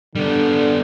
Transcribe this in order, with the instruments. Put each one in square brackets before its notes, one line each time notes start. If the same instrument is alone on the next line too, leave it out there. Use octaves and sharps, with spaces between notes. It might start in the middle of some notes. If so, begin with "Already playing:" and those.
[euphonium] D3 [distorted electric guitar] G3 B3